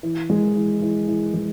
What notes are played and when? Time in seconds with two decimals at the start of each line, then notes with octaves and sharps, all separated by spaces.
0.03 E3
0.30 G#3
0.56 E3
0.82 E3
1.08 E3
1.34 G#3